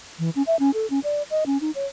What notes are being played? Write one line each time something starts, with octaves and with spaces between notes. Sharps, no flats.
E3
C#4
E5
C#4
A4
C#4
D5
D#5
C#4
D#4
C#5